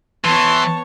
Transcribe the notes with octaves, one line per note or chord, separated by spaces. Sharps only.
E3 B3 C#5 A5 C6